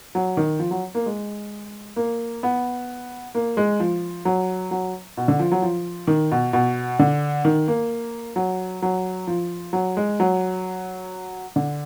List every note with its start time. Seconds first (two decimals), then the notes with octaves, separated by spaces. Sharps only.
0.15 F#3
0.37 D#3
0.59 F3
0.71 F#3
0.95 A#3
1.06 G#3
1.96 A#3
2.43 B3
3.35 A#3
3.57 G#3
3.80 F3
4.25 F#3
4.71 F#3
5.17 B2
5.28 D3
5.39 F3
5.52 F#3
5.62 F3
6.07 D#3
6.31 B2
6.53 B2
6.99 D3
7.45 D#3
7.68 A#3
8.36 F#3
8.82 F#3
9.27 F3
9.73 F#3
9.97 G#3
10.20 F#3
11.56 D3